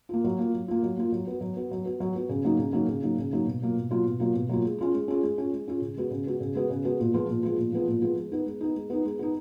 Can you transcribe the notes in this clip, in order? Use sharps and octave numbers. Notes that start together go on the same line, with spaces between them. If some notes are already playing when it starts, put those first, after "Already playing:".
A#3 F4
F#3
A#3 F4
F#3
A#3 F4
F#3
A#3 F4
F#3
B3 F#4
F#3
B3 F#4
F#3
B3 F#4
F#3
B3 F#4
C#3
F#3 A#3 D#4
C#3
F#3 A#3 D#4
C#3
F#3 A#3 D#4
C#3
F#3 A#3 D#4
B2
F#3 A#3 F4
B2
F#3 A#3 F4
B2
F#3 A#3 F4
B2
F#3 A#3 F4
G#3
C#4 F4 G#4
G#3
C#4 F4 G#4
G#3
C#4 F4 G#4
G#3
C#4 F4 G#4
C#3
G#3 B3 F#4
C#3
G#3 B3 F#4
C#3
G#3 B3 F#4
C#3
G#3 B3 F#4
A#2
F3 G#3 B3 F4
A#2
F3 G#3 B3 F4
A#2
F3 G#3 B3 F4
A#2
F3 G#3 B3 F4
G#3
B3 D#4
G#3
B3 D#4
G#3
B3 D#4
G#3
B3 D#4